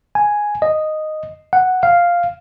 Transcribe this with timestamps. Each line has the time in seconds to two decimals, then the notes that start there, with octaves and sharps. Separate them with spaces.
0.15 G#5
0.62 D#5
1.53 F#5
1.83 F5